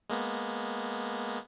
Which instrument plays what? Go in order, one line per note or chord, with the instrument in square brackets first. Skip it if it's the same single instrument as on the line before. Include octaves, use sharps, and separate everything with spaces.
[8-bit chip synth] G#3 A#3 B3